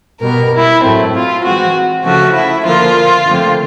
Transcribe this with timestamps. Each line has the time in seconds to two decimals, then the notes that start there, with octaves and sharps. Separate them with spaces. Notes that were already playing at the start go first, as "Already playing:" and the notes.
0.21 B2 G3 B3 A#4
0.52 E4
0.82 A2 F#3 A3 C4
1.13 F4
1.43 E3 G#3 C4 F#4
2.04 C#3 F3 A3 F#4
2.35 E4
2.65 D3 F3 A#3 F4
3.26 D3 F3 A3 C4